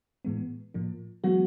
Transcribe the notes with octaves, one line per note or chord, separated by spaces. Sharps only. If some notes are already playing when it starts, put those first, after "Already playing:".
A2 E3 G#3 B3
A2 F3 A#3
E3 F#3 G#3 B3 F#4